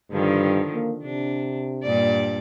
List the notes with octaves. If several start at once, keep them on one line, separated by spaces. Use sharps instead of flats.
G2 D3 D#3 F3
A#3
C3 D4
G2 A#2 D5